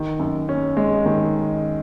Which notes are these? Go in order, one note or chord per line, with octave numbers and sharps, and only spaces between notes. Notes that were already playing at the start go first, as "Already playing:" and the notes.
Already playing: D#3
F#2
C#4
G#3
D#3